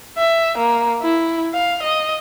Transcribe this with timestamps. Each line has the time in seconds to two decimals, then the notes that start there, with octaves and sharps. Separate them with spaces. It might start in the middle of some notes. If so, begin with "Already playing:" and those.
0.18 E5
0.57 A#3
1.01 E4
1.54 F5
1.83 D#5